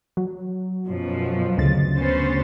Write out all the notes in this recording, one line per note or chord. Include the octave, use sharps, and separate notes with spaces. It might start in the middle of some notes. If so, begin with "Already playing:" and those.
F#3
F#2 B2 F3
D2 C#3 A6
B3 C#4 C5